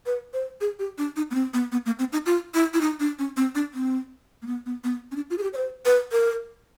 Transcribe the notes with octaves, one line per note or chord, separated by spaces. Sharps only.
B4
C5
G#4
G4
D4
D#4
B3
C4
B3
B3
A#3
C4
D#4
F4
E4
E4
D#4
D4
C#4
C4
D4
C4
A#3
B3
B3
B3
C#4
D4
F4
G#4
G4
C#5
C5
B4
A#4